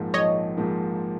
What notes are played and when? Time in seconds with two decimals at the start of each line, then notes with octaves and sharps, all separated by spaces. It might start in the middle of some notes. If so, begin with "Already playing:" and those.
Already playing: A#1 G#2 F3 A#3
0.14 A#1 C#5 D#5
0.57 G#2 F3 A#3